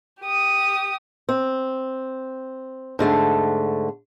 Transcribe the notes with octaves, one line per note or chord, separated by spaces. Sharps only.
G4 D#6
C4
G#2 D3 A3